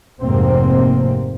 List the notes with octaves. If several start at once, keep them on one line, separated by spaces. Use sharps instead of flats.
F1 G#2 C3 A#3 C4